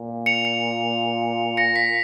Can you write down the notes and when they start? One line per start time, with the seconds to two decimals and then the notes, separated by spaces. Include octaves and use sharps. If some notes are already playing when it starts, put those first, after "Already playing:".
Already playing: A#2
0.26 C#7 F7
0.45 C#7 F7
1.57 A#6 C#7
1.76 B6